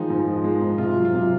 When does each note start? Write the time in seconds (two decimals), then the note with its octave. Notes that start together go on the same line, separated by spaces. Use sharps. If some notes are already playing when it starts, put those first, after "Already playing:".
Already playing: D#3 F3 G#3 D#4
0.10 G#2
0.27 F3
0.44 G#3
0.61 G#2
0.78 C3 F4
0.96 F#3
1.05 F4
1.13 C3